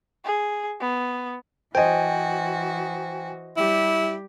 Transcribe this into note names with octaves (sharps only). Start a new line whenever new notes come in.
G#4
B3
E3 F#4 C5 D#5 G5 G#5
G3 E4 G4